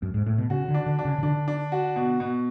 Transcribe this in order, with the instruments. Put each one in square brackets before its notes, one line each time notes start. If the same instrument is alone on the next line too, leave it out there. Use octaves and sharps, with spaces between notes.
[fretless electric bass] F#2
G#2
A2
B2
[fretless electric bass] C#3 [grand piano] F#4
[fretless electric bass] D3
[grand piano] D4
[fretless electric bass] D3
[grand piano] D4
[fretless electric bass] C#3
C#3
[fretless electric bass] D3 [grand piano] D4
[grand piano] D4
F#4
B2
B2